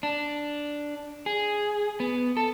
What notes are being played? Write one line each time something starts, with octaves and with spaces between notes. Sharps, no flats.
D4
G#4
B3
A4